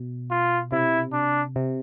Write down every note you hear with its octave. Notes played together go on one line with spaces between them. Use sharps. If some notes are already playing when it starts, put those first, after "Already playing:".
Already playing: B2
F4
C3 E4
D4
C3